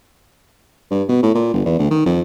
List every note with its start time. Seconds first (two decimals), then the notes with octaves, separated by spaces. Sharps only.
0.91 G2
1.09 B2
1.23 A2
1.35 A#2
1.53 G1
1.66 E2
1.79 D2
1.91 D#3
2.06 F2